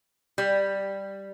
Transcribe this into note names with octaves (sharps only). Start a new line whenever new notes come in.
G3